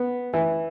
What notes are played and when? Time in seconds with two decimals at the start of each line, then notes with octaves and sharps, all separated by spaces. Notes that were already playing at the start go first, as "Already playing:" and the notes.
Already playing: B3
0.33 E3